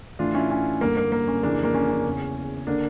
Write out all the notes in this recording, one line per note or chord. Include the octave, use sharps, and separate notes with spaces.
A2 E3 D4 F4
C#4 E4
C#4
G2 D3 A#3
A#3
A#3
C#4
F2 C#3 E3 A#3 D4
A#3
C#4
C#4
E2 C#3 E3
D3 A#3 D4